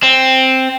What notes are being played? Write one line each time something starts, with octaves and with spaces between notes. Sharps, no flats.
C4